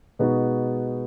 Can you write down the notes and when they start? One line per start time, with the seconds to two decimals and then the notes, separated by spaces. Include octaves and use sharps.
0.19 B2 G#3 B3 D#4 F#4